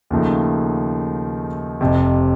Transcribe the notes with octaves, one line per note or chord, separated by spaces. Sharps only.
D#2 C#3 F3 A3 D#4
F1 F2 C3